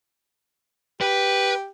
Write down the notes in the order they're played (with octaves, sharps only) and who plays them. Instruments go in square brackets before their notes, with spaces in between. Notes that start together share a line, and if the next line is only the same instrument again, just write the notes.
[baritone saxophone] G4 [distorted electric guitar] B4